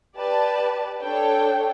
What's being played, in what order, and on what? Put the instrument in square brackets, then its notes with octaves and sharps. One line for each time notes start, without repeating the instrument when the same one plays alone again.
[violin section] G4 B4 D5 A5
D4 A4 C#5 G5